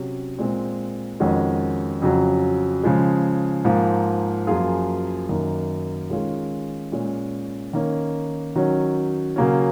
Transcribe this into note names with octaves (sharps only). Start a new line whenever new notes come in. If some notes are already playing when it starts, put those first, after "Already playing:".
Already playing: C3 F#3 C#4
A#2 G#3 C4
F2 D#3 G#3 C#4 F#4
F2 C#3 F#3
C#3 F3 G#3
G#2 F3 A#3 F4
F#2 F3 A#3 F4 G#4
F#2 D#3 A#3
D#3 G#3 C#4 F4 G#4
A#2 G#3 C#4
D#3 A#3 C#4
D#3 F#3 C#4
C#3 F#3 A#3 C#4